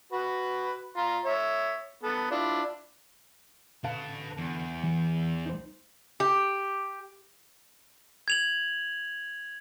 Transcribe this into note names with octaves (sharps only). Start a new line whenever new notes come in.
F#4 B4
F4 A#5 C6
C#5 E5
B3 A4
D4 E4 F4
D3 B4 F5 A5
E2
E3
D#4 C5
G4
G#6 F7 F#7